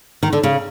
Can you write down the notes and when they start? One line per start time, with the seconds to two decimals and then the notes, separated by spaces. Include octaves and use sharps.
0.23 D#3
0.33 D3
0.43 C#3